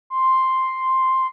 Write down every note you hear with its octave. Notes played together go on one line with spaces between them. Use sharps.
C6